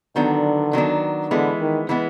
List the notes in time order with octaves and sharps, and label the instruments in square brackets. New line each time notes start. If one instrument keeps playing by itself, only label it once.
[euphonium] D3 [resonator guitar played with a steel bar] D#3 F#3 B3 D4
[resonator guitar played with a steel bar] D#3 F#3 B3 D4
[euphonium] D3 [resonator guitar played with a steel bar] E3 G#3 B3
[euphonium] D#3
[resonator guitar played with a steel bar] E3 G#3 B3